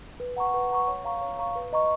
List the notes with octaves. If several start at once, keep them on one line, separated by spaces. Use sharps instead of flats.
B4
F#5 A#5 C#6
B4
F#5 A#5 C#6
C#5
F5 A#5 C#6
C#5
F5 A#5 C#6
B4
D#5 A#5 C#6